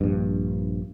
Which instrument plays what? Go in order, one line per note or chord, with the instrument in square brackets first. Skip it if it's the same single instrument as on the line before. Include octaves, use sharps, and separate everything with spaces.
[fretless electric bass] A#1 G2